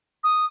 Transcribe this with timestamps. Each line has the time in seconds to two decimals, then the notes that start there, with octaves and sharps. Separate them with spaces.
0.24 D#6